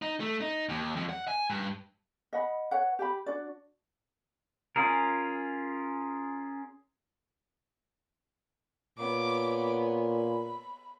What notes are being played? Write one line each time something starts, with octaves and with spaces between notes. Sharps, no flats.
D#4
A3
D#4
D#2
F2
F#5
G#5
G2
D#5 F#5 B5
B4 C#5 F#5
G4 G5 B5
D4 F#4 D5
C#4 F4 G#4 A#4
A#2 B3 C#5 D6
B5